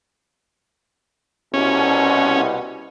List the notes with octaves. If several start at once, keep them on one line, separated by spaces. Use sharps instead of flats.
C2 B2 C#4